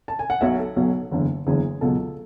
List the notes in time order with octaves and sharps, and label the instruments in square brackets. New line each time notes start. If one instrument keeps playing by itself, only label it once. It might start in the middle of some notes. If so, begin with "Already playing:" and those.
[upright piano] A5
G#5
F#5
B1 B2 F#3 E5
A4
B1 B2 F#3
F#1 E2 D3
F#1 E2 D3 G#4
C#2 B2 F#3 A4